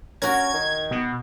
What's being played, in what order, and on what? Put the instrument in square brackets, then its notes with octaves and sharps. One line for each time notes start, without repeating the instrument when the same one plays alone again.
[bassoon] C#4 [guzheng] F#4 A#4 [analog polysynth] G#6
[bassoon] D#3
[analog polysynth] B2